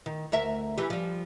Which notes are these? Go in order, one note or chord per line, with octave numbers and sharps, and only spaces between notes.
D#3
D2 A#4 E5
E3 G4
F3 G3